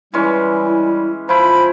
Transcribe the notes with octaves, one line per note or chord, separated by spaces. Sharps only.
E3 G3 G#3 C#4 E4
F3 E4 C5 B5